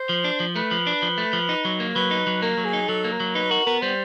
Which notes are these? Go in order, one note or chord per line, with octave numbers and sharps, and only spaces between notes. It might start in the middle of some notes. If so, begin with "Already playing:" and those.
Already playing: C5
F3
D4
F3
A3 B4
F3
D4
F3
A3
F3
D#4
F#3
A#3
F#3 B4
D#4
F#3
A#3 A#4
F#3
G#4
D#4
F#3 A4
A#3
A#4
F#3
D#4 B4
F#4 A#4
B3 A#4
G3 C5